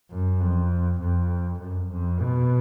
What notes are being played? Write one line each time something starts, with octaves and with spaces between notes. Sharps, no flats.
F#2
F2
F2
F#2
F2
B2